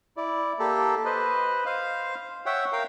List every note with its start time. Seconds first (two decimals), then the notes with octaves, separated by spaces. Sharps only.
0.17 E4 D5
0.59 A#3 G4 A4
1.05 B4 C5 D#5
1.66 C5 F5
2.46 C#5 E5 F#5 G5
2.73 A#4 F5 G5